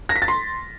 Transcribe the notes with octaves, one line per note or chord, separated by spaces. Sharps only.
A#6
B6
A6
C6